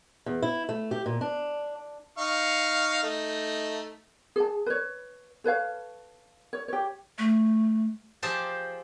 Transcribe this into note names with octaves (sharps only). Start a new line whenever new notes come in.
E2
E4
A3
G4
A#2
D4
D#4 F5 C#6
A3 D#4
G#4 A5
B4 C#5
A4 B4 C#5 F5
C#5
G4 C#5
A3
F3 G4 G#4 C5 E5 A5